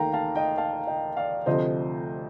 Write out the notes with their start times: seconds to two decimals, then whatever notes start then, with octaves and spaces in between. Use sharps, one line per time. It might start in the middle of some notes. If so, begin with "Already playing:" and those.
Already playing: D#2 D#3 A3 F5 G5 A#5
0.13 F5 A5
0.36 D#5 G5
0.58 F5 A5
0.87 D#5 G5
1.17 D5 F5
1.46 D2 C3 F3 A3 C5 D#5